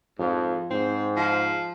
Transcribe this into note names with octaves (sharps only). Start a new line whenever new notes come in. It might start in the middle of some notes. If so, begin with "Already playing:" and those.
F2 G#2
G#2 C4
F3